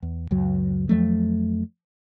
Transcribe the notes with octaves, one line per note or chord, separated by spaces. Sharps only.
E2
C#2 F#2 F#3
F2 F3 F#3 A3